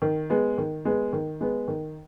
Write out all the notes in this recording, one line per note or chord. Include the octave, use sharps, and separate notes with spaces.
D#3
G#3 B3
D#3
G#3 B3
D#3
G#3 B3
D#3